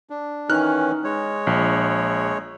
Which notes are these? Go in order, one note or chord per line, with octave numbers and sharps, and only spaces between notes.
D4
D#3 E3 C#4 D#4 F6 F#6
G#3 C#5
A#1